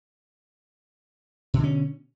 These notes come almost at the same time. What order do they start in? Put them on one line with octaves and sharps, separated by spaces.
B2 D3 C#4